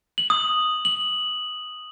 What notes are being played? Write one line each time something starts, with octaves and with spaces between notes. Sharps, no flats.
F#7
D#6
F#7